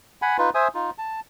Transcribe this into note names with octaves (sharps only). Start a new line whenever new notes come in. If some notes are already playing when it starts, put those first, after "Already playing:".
F#5 G#5 B5
D#4 F4 B4
C5 E5 G#5 D#6
D#4 F4
A5